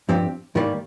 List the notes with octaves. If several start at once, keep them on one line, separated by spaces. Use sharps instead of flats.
G2 F3 C4 G4
G#2 D#3 G3 A#3